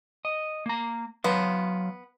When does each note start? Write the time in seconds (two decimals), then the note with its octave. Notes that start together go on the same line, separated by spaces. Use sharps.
0.25 D#5
0.66 A#3 A#5
1.24 F#3 B3 F5 C6